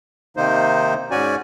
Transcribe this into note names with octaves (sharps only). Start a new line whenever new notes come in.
C3 D#3 A#3 D#4 C5
G#2 C#4 F#4 D5 G#5